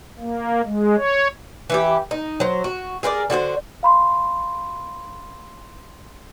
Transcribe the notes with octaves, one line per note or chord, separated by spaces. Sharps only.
A#3
G#3
C#5
E3 E4 G4
D#4
F#3 C5
F#4
G#4 A#4 B4 D5
D3 F#4 G#4 C5
F5 B5 C6